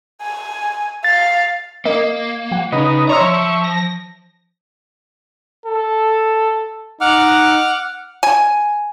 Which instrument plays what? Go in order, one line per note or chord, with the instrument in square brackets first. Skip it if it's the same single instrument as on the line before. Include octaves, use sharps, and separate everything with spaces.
[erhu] G#5
[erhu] F5 [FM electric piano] A6
[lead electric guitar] A#3 [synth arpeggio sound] A#4 D#5
[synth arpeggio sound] F3 F#5
[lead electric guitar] C#3 [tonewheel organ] D#4 B4 D#5
[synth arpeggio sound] C#5 C6 E6 [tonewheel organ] E5 C#6 [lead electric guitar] A#5
[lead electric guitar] F3
[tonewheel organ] A#6
[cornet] A4
[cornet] D#4 [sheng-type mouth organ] F#5 D6 F6
[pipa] G#5